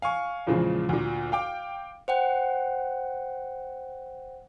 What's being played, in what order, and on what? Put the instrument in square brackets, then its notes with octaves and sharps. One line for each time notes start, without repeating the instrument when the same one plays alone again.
[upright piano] F5 G#5 C#6
E2 A#2 C#3 F3 G#3
D2 A#2
F5 G5 D6
[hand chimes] C5 F#5 G5